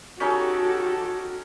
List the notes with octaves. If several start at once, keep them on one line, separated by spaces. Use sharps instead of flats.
C#4 D#4 F#4 G4 A4 C#5